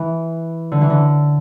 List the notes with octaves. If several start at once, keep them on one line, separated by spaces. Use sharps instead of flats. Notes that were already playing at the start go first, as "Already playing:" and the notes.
Already playing: E3
D3
E3
D3